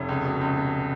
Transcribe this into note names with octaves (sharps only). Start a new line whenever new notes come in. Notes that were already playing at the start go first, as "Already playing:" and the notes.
Already playing: F1 C#5
C#2
B2
C#2
B2